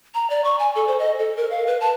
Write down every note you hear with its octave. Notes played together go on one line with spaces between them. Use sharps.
A#5
D5
C#6
G#5
A4
C5
D#5
A4
A#4
F5
B4
A5